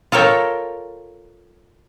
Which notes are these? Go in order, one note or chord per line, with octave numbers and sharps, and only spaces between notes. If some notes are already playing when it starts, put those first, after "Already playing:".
F4 A4 A#4 C#5 G5